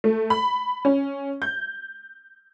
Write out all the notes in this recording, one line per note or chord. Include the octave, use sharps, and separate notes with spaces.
A3
B5
C#4
G6